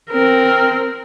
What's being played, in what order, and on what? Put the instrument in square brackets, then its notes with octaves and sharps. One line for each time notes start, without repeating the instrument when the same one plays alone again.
[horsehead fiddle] C4 A#4